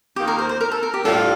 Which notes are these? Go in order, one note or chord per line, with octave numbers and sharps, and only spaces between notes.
D#2 D#3 A#3 F4 G4
A#4
C5
C5
A#4
A4
A#4
G4
A2 G3 D4 F4 A4